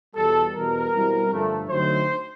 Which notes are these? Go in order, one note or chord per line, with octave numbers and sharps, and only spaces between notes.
E2 B2 G3 A4
E2 B2 G3 A#4
B2 G3 C4 E4
G2 D3 F3 A3
D3 F#3 A3 C4 D#4 C5